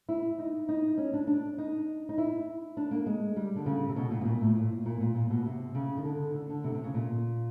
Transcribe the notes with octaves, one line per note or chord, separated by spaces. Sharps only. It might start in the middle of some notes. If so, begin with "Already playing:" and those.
E4
D#4
D#4
C#4
D4
D4
D#4
D#4
E4
D4
A#3
G#3
G3
D3
C#3
C3
B2
A#2
A2
A#2
A2
A#2
A#2
A#2
A#2
B2
C3
C#3
D#3
D3
D3
D3
C3
C3
C#3
A#2